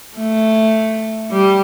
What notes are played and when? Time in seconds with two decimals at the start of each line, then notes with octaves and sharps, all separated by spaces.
0.17 A3
1.32 G3